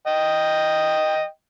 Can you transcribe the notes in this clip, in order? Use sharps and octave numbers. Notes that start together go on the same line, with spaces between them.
D#5 G5